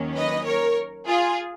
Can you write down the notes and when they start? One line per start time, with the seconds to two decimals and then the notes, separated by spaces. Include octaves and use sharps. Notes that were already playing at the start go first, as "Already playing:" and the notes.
Already playing: D#2 D#3 F#3 A#3 C#4
0.16 B4 D#5
0.46 A#4 C#5
1.07 F4 G#4